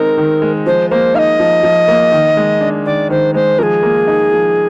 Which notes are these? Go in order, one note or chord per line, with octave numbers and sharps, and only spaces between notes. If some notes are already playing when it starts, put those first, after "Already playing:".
Already playing: D#3 G#3 C4 D#4 A#4
D#3
G#3
F3 C5
A#3 C5
D#4 D#5 F5
F3
F3
A#3
D#3
G#3
D4
D#3 D5
D#3 C5
G#3 C5
F3 G#4 A#4
A#3
D#4
F3